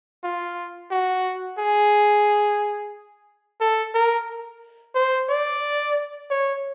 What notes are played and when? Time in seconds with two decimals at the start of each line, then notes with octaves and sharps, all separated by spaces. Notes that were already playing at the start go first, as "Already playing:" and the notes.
0.24 F4
0.91 F#4
1.59 G#4
3.61 A4
3.95 A#4
4.95 C5
5.29 D5
6.30 C#5